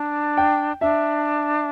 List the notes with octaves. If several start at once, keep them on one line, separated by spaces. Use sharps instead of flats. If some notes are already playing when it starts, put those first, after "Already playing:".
Already playing: D4
G5
D4 E5